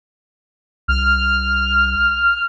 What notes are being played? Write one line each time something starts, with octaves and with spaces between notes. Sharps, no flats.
C2 F6